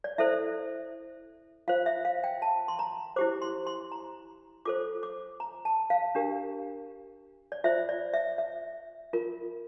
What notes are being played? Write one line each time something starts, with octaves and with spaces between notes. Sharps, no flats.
D5
E4 A4 C5 E5
F4 C5 F5
E5
F5
G5
A5
C6
A#5
E4 G4 C5 D6
C6
C6
A#5
F4 A4 C5 D6
D6
A#5
A5
F5
D4 G4 A#4
D5
F4 C5 E5
D5
E5
E5
F4 A#4